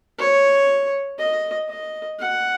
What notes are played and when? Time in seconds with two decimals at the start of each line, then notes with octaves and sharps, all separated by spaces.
0.18 C#5
1.18 D#5
1.69 D#5
2.19 F#5